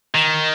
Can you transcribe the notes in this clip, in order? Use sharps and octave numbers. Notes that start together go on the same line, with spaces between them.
D#3